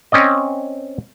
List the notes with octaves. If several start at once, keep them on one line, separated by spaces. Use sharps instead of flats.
C4 C#4 D5 D#5